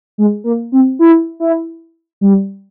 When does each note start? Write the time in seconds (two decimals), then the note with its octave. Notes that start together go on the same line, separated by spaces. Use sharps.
0.18 G#3
0.44 A#3
0.72 C4
0.99 E4
1.40 E4
2.21 G3